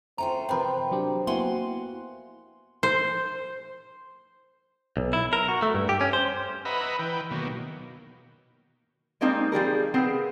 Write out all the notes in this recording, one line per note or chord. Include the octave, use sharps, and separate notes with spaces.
A3 C4 C#4 F4 A#5
C3 F3 C4 A#4 B4 G5
F#3 D4 G4
A#3 B3 E4 F#4 F5 G#5 C6
C5
B1
E4
A#4
F#4
A3
G2
G4
C#4
C5
B4 D#5 E5 F#5 A#5 B5
E3 B4 G5
B2 D#3 F#3 A#3
G3 G#3 A#3 C4 D#4
F3 G3 G#4 A#4
B3 C4 G#4 A#4